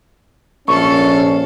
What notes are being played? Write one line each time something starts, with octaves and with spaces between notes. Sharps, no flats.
A#1 C#4 A4 F5 C#6